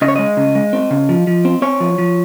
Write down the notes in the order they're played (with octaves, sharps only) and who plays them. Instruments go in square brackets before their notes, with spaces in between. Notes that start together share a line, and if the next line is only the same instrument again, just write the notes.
[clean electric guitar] C#3 D#5
C#5
G#3 D#5
C#3
G#3
C4
C#3
F3
F3
C4
C4 C#5
F3
F3